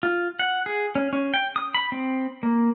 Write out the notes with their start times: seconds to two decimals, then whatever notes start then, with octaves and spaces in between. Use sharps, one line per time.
0.03 F4
0.39 F#5
0.66 G#4
0.95 C#4
1.13 C#4
1.34 G5
1.56 D#6
1.74 B5
1.92 C4
2.43 A#3